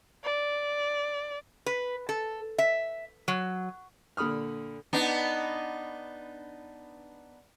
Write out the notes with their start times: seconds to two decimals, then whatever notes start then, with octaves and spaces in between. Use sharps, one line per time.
0.24 D5
1.66 B4
2.09 A4
2.58 E5
3.28 F#3
4.17 A#2 D3 B5 D#6 F6
4.93 B3 D4 D#4